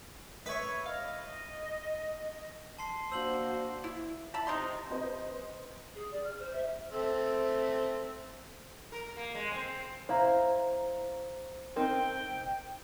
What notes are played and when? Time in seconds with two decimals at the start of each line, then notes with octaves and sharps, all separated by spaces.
0.46 B4 C#5 E5 C#6
0.86 D#5 F5
2.79 A5 C6 C7
3.12 A#3 D4 F#4 C5 E6 F#7
3.84 E4
4.34 E5 A5 B5
4.47 C3 D#4 C6
4.90 C4 B4 C5 D#5
5.95 G#4
6.11 D5
6.24 F6
6.39 C5
6.53 E5
6.93 A3 C4
8.92 A#4
9.17 A#3
9.35 G#3
9.52 C4
10.09 E4 C5 F5 A#5
11.76 C4 D#4 A#4 G5